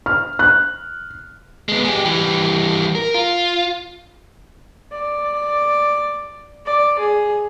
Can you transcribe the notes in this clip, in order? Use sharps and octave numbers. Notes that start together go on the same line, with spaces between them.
F6
F#6
G#3 B3
G#3 G4
E3 G3
A#4
F4
D5
D5
G#4